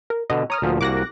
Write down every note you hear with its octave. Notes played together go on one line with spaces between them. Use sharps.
A#4
B2 D3 D#5
C#5 A#5 D#6 F6
D2 A#2 F3
C2 A#3 F#4 D6 F#6 A#6